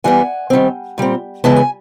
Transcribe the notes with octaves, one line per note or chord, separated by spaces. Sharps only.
E3 G3 B3 F#5 G#5
D#3 G3 C4
A#2 G3 C4
C#3 E3 G#3 B3 A5
G#5